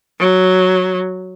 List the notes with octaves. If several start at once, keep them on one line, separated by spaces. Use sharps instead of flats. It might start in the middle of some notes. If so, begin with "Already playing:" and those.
F#3